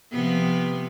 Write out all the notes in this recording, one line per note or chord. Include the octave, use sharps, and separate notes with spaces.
C3 F3 B3